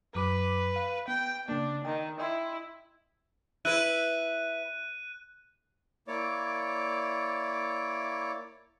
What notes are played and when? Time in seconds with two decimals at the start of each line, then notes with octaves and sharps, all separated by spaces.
0.15 F#2 F#3 B4 D6
0.76 F5
1.08 B3 G5
1.49 C#3 A#3 D4
1.85 D#3 G5
2.20 E4 D#5 G5 C6
3.65 E4 B4 F#6 D#7
6.08 A#3 E4 C#5 D5 D6